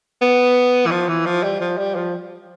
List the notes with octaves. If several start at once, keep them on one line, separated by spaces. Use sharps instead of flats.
B3
E3
F3
E3
F3
G3
F3
G3
F3